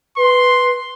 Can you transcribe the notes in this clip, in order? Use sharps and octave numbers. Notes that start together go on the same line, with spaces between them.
B4 C6